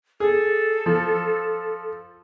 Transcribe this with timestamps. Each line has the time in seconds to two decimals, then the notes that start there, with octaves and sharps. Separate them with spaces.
0.20 G#4 A4
0.86 F3